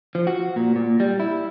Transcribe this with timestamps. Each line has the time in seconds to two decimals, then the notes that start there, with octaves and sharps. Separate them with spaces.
0.15 F3
0.27 F#4
0.56 A#2
0.76 A#2
1.00 G3
1.20 E4